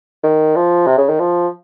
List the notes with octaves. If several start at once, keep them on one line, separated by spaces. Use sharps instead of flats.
D#3
F3
C3
C#3
D#3
F3